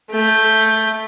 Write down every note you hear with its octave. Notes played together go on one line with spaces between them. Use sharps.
A3 G6